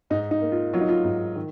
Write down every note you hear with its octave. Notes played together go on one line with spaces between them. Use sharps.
G#2 D#4
D#4
A#3
F4
F#3 F4
D#4
F4
G#2
D#3